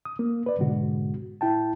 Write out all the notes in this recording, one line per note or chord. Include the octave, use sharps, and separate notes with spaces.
D#6
A#3
B4 D5
G#2 B2 D3 G#3 F#4
A2 E4 G5 A5